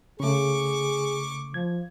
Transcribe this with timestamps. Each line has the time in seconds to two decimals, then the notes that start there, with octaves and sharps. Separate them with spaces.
0.20 C#3 A3 G#4 C#6 D6
1.54 F3 G#6